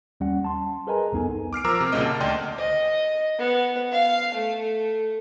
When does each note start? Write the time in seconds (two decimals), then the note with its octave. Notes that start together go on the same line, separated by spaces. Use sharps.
0.20 D#2 G3 C#4 F#5
0.44 A5 C6
0.87 G#4 A#4 B4 D#5 G#5 A#5
1.12 C2 F2 B3 D#4 A4 G#5
1.53 D6 F6 C7 D7
1.64 F3 A#4 A#5 D6 E6 F6
1.80 C3
1.92 C2 A#2 C#3 A#3 D#5 D6
2.06 A5
2.20 D2 D5 D#5 G5 C6 F6
2.58 D#5
3.38 B3
3.92 F5
4.34 A3